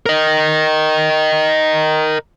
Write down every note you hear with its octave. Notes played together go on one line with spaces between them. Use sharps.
A#4 D#5